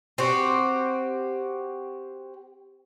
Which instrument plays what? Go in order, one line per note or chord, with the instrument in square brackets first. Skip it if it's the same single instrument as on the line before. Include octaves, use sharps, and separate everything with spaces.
[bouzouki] C4 F#4 G4